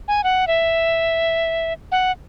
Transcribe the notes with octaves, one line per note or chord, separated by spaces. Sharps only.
G#5
F#5
E5
F#5